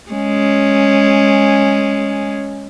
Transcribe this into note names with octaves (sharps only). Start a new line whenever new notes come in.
G#3 C#4